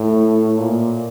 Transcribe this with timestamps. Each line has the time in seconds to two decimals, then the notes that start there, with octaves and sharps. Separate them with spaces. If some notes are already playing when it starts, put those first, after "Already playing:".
Already playing: A2
0.59 A#2